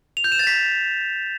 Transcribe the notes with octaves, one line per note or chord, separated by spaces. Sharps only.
F7
G6
E7
A6
B6